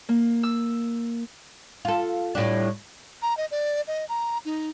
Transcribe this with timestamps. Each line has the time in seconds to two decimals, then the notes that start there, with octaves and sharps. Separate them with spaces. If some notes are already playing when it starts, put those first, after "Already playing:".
0.09 A#3
0.43 E6
1.85 F4 A4
2.35 A2 G3 D4
3.22 A#5
3.37 D#5
3.51 D5
3.88 D#5
4.09 A#5
4.45 D#4